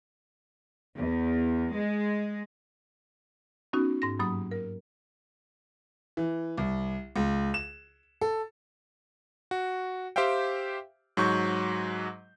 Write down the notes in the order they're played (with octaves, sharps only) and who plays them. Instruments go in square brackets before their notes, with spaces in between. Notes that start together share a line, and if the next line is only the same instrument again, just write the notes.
[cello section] E2
G#3
[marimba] B3 C#4 D#4 F#4
G#2 A#6
G2 F#3 A#3 B5 D#6
A#4
[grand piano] E3
C2
C#2
E7
A4
[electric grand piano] F#4
G4 C5 E5 F5 G5
G#2 F#3 C#6 G6